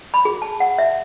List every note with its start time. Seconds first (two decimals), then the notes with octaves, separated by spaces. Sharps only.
0.14 B5
0.25 G#4
0.42 A5
0.60 F#5
0.78 E5